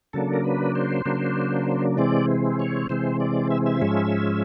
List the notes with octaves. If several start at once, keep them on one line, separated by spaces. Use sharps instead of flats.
C#3 F#3 A#3 D4 A4
A#4
B4
C5
C#3 F#3 A#3 D4
C3 E3 G#3 C4 D5
C#5
C3 E3 G#3 C4 C5
D5
E5
E5
G#2 F3 G#3 C#4